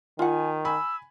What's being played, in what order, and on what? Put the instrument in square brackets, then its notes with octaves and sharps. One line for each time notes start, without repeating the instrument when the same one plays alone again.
[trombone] D#3 [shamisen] F4 F#5 [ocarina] G#5
[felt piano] G#5 B5 [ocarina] E6